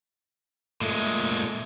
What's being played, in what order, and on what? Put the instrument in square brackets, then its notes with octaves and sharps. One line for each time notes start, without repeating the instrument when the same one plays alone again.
[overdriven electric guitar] A#2 G#3 [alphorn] A3